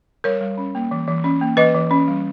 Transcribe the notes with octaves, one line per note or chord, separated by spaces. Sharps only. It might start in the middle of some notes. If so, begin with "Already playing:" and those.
G3 A#4 C#5
G3
C#4
A#3
E3
E3
C#4
A#3
E3 B4 D#5
E3
C#4
G3